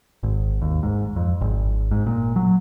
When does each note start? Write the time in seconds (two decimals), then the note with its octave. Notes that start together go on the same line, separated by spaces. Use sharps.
0.23 G#1
0.62 D#2
0.83 G#2
1.16 F2
1.41 G#1
1.91 G#2
2.07 A#2
2.36 F#3